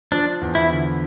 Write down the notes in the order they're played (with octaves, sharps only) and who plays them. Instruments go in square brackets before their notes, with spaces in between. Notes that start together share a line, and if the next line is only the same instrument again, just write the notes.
[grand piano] F3 [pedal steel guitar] D4
[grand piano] E2
[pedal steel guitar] E4
[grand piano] D3